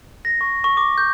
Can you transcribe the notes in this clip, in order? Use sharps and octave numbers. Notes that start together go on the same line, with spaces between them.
A#6
C#6
C#6
D6
G6